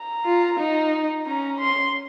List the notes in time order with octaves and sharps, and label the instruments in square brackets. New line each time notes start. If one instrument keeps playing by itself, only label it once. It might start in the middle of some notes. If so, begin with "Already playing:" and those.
Already playing: [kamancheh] A#5
[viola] F4
D#4
[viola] C#4 [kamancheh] A#5
[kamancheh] C6